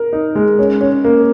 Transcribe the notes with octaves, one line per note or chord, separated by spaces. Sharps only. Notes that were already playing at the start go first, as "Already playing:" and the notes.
Already playing: A#4
D#4
G#3
C#4
C#4
A#3